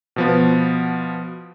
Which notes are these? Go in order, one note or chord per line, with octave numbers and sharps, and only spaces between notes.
B2 F3 B3